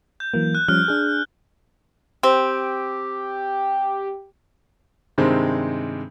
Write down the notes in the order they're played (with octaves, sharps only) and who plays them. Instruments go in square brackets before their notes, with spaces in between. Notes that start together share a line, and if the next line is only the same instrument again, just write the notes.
[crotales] G6
[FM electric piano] E3 F#3 A#3
[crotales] F#6
[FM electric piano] F3 G3 C#4 [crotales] F6
[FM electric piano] D4 G#4
[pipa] C4 [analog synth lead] G4
[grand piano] G2 C3 D#3 G#3 C4